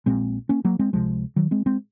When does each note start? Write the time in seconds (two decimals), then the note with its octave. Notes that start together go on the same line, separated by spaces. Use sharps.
0.06 A#1 A#2 G#3 C4
0.49 A#3 C#4
0.65 F#3 A#3
0.79 G#3 C4
0.93 C#2 C3 F3 G#3
1.36 D#3 F#3
1.51 G#3 C4
1.66 G#3 C4